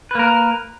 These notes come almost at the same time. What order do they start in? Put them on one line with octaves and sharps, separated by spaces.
B4 A#3 A#4